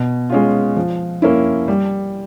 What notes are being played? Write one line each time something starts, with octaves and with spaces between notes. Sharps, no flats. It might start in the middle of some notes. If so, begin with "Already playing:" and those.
Already playing: B2
G#3 C#4 F4
F3
A#3 C#4 E4
G3